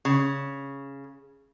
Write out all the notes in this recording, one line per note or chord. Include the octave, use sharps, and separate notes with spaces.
C#3